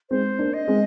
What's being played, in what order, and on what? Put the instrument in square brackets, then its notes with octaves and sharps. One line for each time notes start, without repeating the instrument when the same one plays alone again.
[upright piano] G#3 C4 [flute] C5
[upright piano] A#3 D4
[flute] D#5
[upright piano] G#3 C4